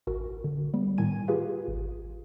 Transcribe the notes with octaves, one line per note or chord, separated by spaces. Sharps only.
A1 F#4 A#4
D3
G3 B3
A2 D#3 G#5 G#6 D#7
F4 G4 G#4 B4 F5
G#1